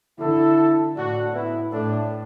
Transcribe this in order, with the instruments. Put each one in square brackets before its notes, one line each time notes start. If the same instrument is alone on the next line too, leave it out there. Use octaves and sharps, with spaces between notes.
[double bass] D3 [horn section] E4 A4
[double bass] A2 [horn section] D4 F#4
[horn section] B3 E4
[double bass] A2 [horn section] A3 D4